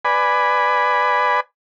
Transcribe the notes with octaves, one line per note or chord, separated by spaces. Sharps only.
B4 D5 G#5 B5